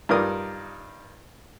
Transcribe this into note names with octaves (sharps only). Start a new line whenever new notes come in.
G2 D#4 F4 A#4 D5 D#6